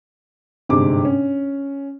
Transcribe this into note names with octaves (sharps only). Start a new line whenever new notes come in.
G1 G#2 C3 C4 G#4 D6
C#4